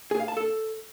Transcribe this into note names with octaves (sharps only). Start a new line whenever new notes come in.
G#4
F5
A5
A4